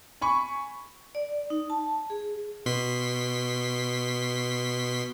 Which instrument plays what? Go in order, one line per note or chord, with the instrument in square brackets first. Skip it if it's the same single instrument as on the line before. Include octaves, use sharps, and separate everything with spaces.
[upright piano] G#5 B5 C#6
[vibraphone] D5
D#4
A5
G#4
[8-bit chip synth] B2 C6 B6